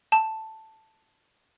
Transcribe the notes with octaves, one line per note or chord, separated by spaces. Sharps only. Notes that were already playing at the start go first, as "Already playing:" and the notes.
A5